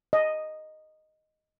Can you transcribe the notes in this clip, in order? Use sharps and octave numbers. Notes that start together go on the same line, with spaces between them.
D#5